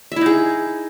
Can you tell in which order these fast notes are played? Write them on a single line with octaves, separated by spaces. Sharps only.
E5 E4 D#4 G#4